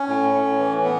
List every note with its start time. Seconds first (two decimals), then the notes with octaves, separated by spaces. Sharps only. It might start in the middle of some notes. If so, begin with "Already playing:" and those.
Already playing: C#4
0.08 A2
0.34 A2
0.59 E3
0.84 B3